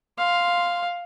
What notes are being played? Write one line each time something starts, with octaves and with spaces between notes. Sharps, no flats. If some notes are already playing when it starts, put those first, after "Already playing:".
F5 C6